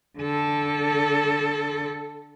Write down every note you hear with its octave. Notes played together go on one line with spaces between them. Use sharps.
D3 A4